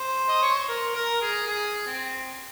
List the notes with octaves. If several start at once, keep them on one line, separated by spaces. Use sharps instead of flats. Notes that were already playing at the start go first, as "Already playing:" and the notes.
Already playing: C5
D#5
C#5
C5
A#4
A#4
G#4
G#4
C4